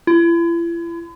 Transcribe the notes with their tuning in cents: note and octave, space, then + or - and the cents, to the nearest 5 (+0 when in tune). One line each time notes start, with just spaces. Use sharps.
E4 +40